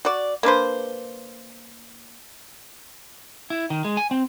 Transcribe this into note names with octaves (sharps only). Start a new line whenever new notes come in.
F#4 D5
A#3 D4 B4 C5
E4
D#3
G#3
G#5
C4